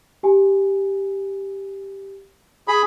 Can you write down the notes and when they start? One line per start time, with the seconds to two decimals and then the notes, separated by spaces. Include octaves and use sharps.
0.23 G4 G#5
2.68 G#4 B5